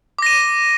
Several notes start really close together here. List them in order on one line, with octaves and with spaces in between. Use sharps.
D6 A#6 D#7